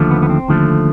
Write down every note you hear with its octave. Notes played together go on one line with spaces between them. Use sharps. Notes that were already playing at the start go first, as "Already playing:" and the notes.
Already playing: D#2 D3 F3 A3
B3
B3
C4
D#2 D3 F3 A3